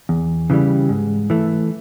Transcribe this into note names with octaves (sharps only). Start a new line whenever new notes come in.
E2
C#3 E3 G3
G#2
E3 A3